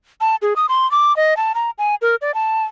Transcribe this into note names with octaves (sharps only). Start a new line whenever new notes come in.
A5
G#4
D#6
C6
D6
D#5
A5
A#5
G#5
A#4
D5
A5